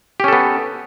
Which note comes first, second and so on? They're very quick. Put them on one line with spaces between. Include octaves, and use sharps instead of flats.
G4 C#4 A4 B3